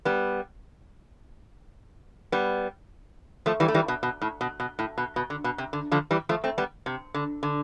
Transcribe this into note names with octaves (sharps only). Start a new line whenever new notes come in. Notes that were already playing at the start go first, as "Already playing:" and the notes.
G3 B3
G3 B3
F3 A3
E3 G3
A3
E3 G3
B2
B2
A2
B2
B2
A2
B2
B2
D3
B2
C3
D3
D3 F3
E3 G3
F3 A3
A3 C4
G3 B3
C3
D3
D3